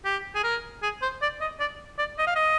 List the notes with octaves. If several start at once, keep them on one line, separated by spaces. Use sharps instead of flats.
G4
G#4
A#4
G#4
C5
D5
D#5
D5
D5
D#5
F5
D#5